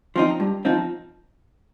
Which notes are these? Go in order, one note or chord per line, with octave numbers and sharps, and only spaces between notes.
F3 C4 D#4
G2
F3 C4 D#4